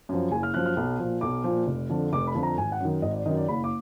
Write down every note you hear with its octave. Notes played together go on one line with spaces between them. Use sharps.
F#2 F3
F#1 G#5
F6
F#2 F3 F#6
F6
B1
A#2 F3
B1 D6
A#2 F3
F1
F2 D3 F3
F1 D6
B5
F2 D3 F3
A#5
G#1 G#5
F#5
F#2 D#3
G#1 D#5
D5
F#2 D#3 D#5
D5
F#1 B5
D6